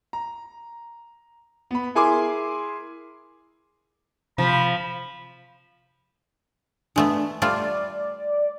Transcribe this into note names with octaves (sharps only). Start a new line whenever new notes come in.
A#5
B3 B5
E4 G#4 A#4 G#5 C6 D6
C3 F3 B5
G#3 A3 B3 D4
G3 A3 F4 D5